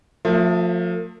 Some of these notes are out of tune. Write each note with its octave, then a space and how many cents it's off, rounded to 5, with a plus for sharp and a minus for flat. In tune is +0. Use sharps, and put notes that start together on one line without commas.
F3 +25 A3 +45 E5 +0